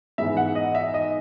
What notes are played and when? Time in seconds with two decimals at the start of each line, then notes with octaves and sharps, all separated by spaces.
0.18 G#2 E3 G#3 B3 E5
0.37 F#5
0.55 D#5
0.75 E5
0.94 D#5